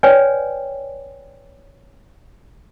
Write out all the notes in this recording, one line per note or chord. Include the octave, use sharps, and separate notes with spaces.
B4 C#5 D5 G5 G#5